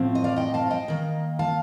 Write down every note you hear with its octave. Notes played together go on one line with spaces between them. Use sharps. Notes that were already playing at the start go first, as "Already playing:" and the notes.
Already playing: A2 F3 C4
D#5
D5 F5
D#5 G5
F5 A5
D#5 G5
D#3 A#3
F5 A5